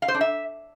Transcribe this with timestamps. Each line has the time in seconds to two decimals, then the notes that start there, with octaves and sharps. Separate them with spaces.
0.02 F5
0.08 C5
0.14 D4
0.21 E5